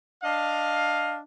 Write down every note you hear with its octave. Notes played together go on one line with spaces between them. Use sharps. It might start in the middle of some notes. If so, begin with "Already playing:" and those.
D4 D#5 F5